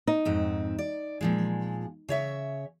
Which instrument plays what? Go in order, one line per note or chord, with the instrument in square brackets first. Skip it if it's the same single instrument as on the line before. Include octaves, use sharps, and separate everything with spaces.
[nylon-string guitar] D#4
[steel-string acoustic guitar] F2 G#2 C4
D5
A#2 F3 G#3
C#3 C#5 E5